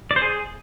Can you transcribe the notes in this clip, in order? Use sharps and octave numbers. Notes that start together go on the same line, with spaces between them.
D5
C5
G#4